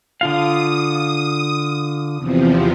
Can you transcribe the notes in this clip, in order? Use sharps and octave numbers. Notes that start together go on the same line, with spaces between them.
D3 F4 F5 D#6
E2 C3 F3